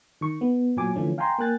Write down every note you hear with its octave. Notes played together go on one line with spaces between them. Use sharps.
D#3 C#6
B3
A#2 F#3 G#5 D6
D3 E3 F3 A3 C#4
F5 G5 G#5 A#5 C6
A#3 G5 G#5 F#6 A6